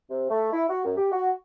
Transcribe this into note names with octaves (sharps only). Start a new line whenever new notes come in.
C3
A3
E4
F#4
F#2
G4
F#4